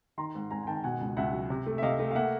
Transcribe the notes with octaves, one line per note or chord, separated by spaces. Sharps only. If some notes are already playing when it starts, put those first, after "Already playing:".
D#3 A#5 C6
G#2
G#2 G#5 A#5
G#5
D#3 G5 A5
B2 F#5 G#5
C#2
C#2 E5 F#5
F#3
C3
A3
E5
C3 D#5 F5
A3
F5
A#3 E5 F#5